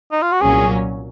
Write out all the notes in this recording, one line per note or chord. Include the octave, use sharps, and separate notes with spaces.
D#4
F4
F#4
C2 A#2 F#3 C#4 G#4